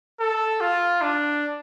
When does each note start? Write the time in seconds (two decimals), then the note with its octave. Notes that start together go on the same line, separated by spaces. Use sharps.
0.20 A4
0.61 F4
1.02 D4